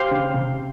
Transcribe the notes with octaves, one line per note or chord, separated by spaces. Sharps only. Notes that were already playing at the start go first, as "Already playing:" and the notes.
Already playing: G4 C5 F5
C#3
C3